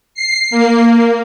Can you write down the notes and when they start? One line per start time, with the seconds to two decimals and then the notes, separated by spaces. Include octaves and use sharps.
0.14 C7
0.51 A#3